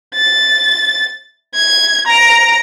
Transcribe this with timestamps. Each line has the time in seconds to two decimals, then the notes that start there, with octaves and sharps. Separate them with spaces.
0.15 A6
1.54 G#6
2.07 A#5 D7